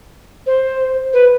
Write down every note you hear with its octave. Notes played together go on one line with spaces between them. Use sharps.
C5
B4